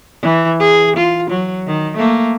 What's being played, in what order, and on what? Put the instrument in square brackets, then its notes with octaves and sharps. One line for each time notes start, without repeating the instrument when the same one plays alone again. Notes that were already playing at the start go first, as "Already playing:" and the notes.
[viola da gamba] E3
G#4
F4
F#3
D#3
A3 A#3